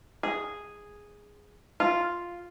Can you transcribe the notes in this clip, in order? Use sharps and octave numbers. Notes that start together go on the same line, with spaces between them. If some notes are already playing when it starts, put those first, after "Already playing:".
G#4
F4